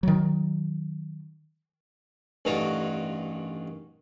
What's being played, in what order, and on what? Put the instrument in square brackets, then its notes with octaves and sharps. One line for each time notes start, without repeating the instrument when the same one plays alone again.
[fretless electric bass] D#3 F#3
[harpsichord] A1 G2 D#3 F4 F#4 A#5